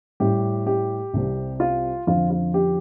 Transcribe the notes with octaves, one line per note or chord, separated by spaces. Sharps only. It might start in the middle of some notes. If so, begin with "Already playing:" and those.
A2 G3 G4
G4
C2 C3 G3
F4
F2 D3 F3 F4
F4
G4